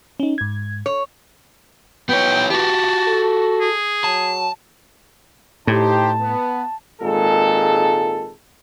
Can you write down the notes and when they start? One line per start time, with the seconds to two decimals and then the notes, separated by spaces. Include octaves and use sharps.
0.20 C#4 D#4
0.38 G#2 G#6
0.86 C#5
2.09 E3 B3 C#5 G5
2.50 F#4 G4 A5
3.08 A4
3.60 G#4
4.04 F#3 A5
5.67 A2 D#4 G4 C5 A5
6.20 B3
7.02 G#1 A#2 G#3 A4